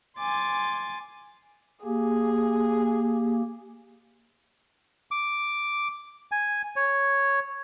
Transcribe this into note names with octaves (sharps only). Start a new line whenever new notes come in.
G#5 C6 D6 A6
A#3 G4 G#4
D6
G#5
C#5